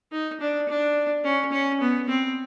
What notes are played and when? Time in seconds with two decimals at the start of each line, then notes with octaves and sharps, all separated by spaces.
0.12 D#4
0.41 D4
0.69 D4
1.24 C#4
1.52 C#4
1.81 B3
2.09 C4